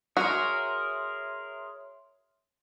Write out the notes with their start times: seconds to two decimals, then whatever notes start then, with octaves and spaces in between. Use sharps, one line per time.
0.17 F#4 G#4 A#4 C#5 E5 C6